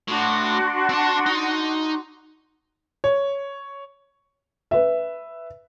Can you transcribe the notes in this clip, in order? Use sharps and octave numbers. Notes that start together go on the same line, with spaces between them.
A2 D4 F#4 C6
C4 A5
D#4
C#5
B4 E5